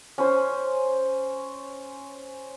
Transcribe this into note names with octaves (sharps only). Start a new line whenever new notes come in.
C#4 C5